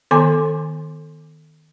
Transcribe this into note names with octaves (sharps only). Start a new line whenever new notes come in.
D#3 B3 A4 G#5 C6 D6